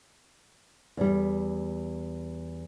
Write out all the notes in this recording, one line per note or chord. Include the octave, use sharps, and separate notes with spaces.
E2 G3